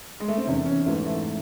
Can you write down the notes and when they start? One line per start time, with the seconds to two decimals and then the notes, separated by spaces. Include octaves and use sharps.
0.20 G#3
0.28 A3
0.38 C4
0.45 E2 C3 D#3 C#4
0.66 C#4
0.86 G#2 E3 A3
1.06 A3